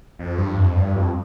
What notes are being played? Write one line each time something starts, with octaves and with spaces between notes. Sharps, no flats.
F2
G2
F2
G2
F2